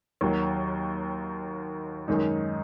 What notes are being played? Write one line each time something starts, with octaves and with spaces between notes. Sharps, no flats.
D#2 D#3 F#3
F#2 D#3 G#3 D#4